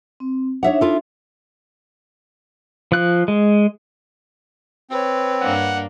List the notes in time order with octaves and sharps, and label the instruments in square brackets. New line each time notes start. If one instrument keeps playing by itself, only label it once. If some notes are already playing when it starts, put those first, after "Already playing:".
[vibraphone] C4
[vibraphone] D4 D#4 [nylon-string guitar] C#5 E5 F#5
[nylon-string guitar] E4 F4 A4
[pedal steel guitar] F3 F#6
G#3
[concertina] C4 [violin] B4 C#5
[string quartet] G2 A#3 D4 [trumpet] F#5